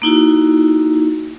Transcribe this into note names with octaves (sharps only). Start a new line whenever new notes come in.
A#3 D#4 E4 F#4